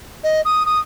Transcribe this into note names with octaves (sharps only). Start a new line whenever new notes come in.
D#5
D#6
D#6